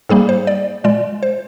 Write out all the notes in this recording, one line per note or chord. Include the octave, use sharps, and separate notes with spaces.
G#2 G3 A#3 G#4
C5
D5
A#2 G#3 D5
C5